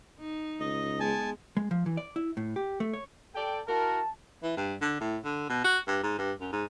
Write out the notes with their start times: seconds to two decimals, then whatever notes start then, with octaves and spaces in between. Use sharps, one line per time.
0.19 D#4
0.60 C#2 D#5
1.00 G#3 B3 G#5 A5
1.57 G#3
1.71 F3
1.86 E3
1.97 D5
2.16 E4
2.37 A2
2.56 G4
2.80 A3
2.93 C#5
3.35 A4 D5 G5
3.67 E4 F#4 A#4 A5
4.43 E3
4.57 G2
4.81 D3
5.00 A2
5.25 D3
5.50 B2
5.64 F#4
5.88 G2
6.03 G#2
6.19 G2
6.41 F#2
6.53 G#2